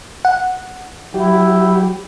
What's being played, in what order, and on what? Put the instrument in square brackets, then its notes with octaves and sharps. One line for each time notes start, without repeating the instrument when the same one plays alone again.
[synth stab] F#5
[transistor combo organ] F#3 G4 [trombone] E4